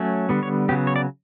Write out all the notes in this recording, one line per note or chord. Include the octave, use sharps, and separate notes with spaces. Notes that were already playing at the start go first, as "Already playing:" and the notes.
Already playing: F#3 A3 C#4
D3 G3 B3
C#5
C#3 F#3 B3 G4
C#5
D5